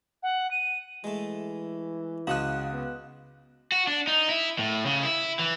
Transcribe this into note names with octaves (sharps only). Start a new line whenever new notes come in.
F#5
D#7
E3 G#3 A3
C#2 F#4 F5 F#5 D#6 F#6
B3
F#4
D4
D#4
E4
A2
C#3
E4
E3